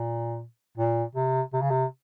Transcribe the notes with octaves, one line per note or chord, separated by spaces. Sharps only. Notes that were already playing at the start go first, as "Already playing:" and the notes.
Already playing: A#2
A#2
C3
C3
C#3
C3